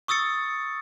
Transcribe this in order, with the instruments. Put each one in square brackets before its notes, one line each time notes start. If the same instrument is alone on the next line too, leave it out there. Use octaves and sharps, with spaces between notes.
[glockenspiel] C#6 D#6 E6 A6 C#7